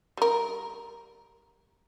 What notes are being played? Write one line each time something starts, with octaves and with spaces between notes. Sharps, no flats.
G3 A#4